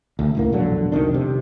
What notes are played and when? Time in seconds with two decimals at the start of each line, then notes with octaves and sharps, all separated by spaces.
0.19 D2
0.35 C#2 A2 A#3
0.53 E1 A#1 D3 F#3
0.92 C2 F2 D#3 D4
1.14 C3